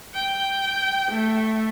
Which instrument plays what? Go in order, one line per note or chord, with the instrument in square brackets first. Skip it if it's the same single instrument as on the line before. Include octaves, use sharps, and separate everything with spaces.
[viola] G5
A3